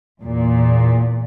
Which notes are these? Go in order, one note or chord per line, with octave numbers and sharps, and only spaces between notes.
E2 A#2